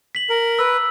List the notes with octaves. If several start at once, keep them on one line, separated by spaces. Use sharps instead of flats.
B6 F#7
A#4
B4 E6